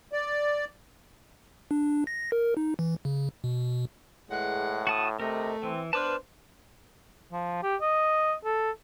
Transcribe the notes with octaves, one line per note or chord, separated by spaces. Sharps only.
D5
D4
A#6
A#4
D#4
E3
C#3
B2
E2 A2 G#3 F#5
F#4 A5 D#6
C3 A3 A#4 D#5
E3 C4
B3 D4 B4 C5 A5 D6 F6
F3
G4
D#5
A4